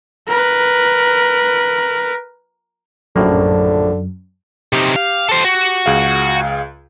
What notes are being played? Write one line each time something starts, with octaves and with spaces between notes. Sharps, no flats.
A#4 B4
A#1 F#2 A2 D3 A#3
C3 D#4 G4
F5
A4 C5
F#4
C#2 G#4 F5